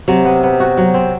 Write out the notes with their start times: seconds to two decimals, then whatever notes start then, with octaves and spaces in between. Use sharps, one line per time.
0.08 C3 F#3
0.25 B3
0.43 B3
0.60 F#4
0.77 F#3
0.94 C4